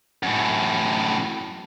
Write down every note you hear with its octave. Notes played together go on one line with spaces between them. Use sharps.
F#2 A2